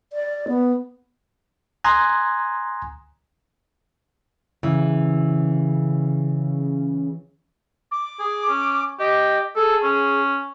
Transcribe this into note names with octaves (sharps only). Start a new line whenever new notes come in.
D5
B3
G#5 A#5 C6 D#6 F#6 G#6
C#3 E3
D6
G#4
C#4
G4 D#5
G#4 A4
C#4